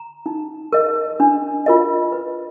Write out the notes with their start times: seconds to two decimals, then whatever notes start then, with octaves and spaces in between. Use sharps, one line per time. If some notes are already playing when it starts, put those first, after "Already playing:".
Already playing: A#5
0.26 D#4
0.73 A#4 D#5
1.20 D4
1.66 F4 A#4 D#5
2.12 B4